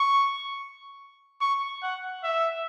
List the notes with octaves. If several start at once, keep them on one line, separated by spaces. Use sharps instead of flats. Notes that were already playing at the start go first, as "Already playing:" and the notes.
Already playing: C#6
C#6
F#5
E5